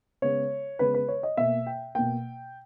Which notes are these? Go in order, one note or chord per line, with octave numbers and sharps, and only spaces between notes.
C#3 G#3 B3 C#5
C#3 G#3 B3 B4
B4
C#5
D#5
B2 A#3 E5
G5
B2 A#3 G5